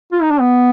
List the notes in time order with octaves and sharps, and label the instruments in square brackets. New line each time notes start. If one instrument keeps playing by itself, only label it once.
[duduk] F4
D#4
D4
B3